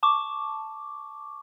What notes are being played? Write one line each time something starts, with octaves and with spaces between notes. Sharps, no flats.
A5 C#6 D6